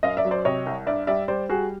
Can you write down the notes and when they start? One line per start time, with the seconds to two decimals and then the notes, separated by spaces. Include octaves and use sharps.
0.03 F#2 D#5 F5
0.17 D5 E5
0.25 F#3
0.31 C5 D5
0.45 C3 C#5 D#5
0.66 C2
0.86 G2 D5 E5
1.07 G3 D5 E5
1.28 G3 C5 D5
1.49 G3 F#4 G#4